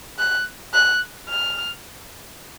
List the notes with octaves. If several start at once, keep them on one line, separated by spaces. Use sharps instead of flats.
F#6
F#6
F6